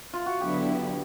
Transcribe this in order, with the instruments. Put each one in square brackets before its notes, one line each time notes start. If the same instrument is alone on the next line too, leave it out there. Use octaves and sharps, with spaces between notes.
[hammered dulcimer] F4
F#4
[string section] D3 F#3 B3 E4 [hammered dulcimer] G4